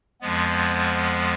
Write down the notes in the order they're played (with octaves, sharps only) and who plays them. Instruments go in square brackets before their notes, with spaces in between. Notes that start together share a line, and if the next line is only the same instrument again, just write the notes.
[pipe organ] F2 F3 G#3 B3